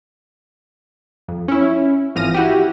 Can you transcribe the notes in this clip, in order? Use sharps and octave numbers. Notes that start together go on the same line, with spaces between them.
F2
C#4 E4
G#1 E3 F3 F6 A#6 D#7
E4 F#4 G4